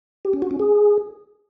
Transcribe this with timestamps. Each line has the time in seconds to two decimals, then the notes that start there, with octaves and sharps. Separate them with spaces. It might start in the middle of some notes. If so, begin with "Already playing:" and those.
0.25 G4
0.33 C#4
0.42 F#4
0.51 C#4
0.60 G#4